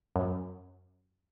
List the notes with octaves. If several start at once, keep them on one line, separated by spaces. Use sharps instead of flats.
F#2